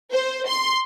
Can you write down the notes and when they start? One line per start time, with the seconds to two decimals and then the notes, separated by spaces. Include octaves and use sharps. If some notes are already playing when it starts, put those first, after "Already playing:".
0.12 C5
0.47 C6